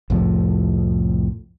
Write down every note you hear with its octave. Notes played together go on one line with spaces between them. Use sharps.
C2 F2 A2 F3